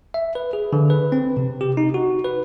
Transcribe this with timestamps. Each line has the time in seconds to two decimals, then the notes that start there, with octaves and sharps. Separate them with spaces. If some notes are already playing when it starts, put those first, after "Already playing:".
0.14 E5
0.35 B4
0.53 G#4
0.73 D3
0.90 B4
1.12 C4
1.37 C3
1.61 G4
1.77 D#4
1.94 F#4
2.24 B4